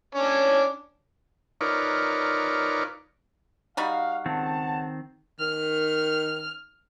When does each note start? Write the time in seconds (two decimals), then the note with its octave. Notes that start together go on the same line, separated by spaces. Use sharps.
0.15 C#4 D4 C#5
1.61 D#4 F4 A#4 B4 C#5 D5
3.77 G3 D#4 F#4 F5
4.26 C#2 D#3 C4 F#5 A5
5.40 D#3 F6